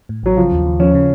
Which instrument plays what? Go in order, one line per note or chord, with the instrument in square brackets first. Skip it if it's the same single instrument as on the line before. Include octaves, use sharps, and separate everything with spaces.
[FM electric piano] A2
[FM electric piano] A1 [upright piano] F#3
[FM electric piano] C#3 [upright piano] F3
[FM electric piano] D#2
D#2
[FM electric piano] F3 [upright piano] C#4
[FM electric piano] C#3